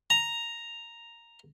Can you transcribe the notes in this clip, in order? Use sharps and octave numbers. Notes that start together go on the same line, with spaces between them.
A#5